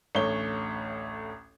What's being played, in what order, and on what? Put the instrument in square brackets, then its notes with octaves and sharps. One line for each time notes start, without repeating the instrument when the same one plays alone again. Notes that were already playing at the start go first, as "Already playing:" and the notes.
[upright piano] A1 D2 A3 C#5 G7